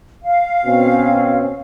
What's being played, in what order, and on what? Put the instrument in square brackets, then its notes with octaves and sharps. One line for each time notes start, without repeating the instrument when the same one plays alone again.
[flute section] F5
[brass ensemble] B2 C4 C#4